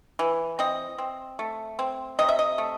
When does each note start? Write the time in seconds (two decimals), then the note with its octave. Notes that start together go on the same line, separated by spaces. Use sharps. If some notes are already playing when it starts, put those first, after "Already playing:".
0.19 E3
0.59 C4 D#5
0.98 C4
1.39 A3
1.79 C4
2.19 C3 D#5
2.29 E5
2.39 D#5
2.58 A3